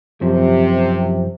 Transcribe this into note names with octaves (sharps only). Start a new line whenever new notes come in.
F#2 C3 F3